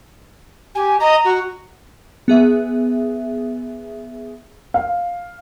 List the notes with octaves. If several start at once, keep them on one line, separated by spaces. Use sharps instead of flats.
G4 G#5
D#5 A#5
F#4
B3 G#4 E5
F5